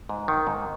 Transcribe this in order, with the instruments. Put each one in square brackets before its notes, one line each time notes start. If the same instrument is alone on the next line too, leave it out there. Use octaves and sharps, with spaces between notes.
[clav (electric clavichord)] G#2
D#3
G#2